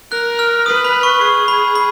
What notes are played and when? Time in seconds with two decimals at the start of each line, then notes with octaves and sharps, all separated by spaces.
0.12 A#4 F#6
0.39 F6
0.66 B4 D#6
0.84 B5
1.03 C#6
1.21 G#4 C#6
1.48 B5
1.75 B5